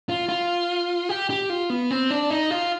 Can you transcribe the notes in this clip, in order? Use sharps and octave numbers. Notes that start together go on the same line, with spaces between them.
F4
F4
G4
G4
F4
B3
C4
D4
D#4
F4